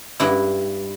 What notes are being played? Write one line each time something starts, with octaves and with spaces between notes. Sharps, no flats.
G2 E4